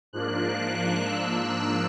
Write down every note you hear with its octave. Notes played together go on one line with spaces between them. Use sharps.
G#2 F3 A#3 D4 F#6
E6